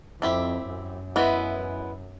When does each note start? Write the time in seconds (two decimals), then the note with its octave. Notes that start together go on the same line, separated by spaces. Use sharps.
0.22 F2 C4 E4 G4
0.69 F#2
1.16 E3 G#3 B3 E4